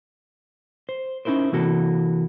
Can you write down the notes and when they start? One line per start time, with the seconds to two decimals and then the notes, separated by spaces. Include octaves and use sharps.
0.89 C5
1.25 C#4 D#4 E4 A#4 C5
1.52 C3 E3 A#3 F#4 A4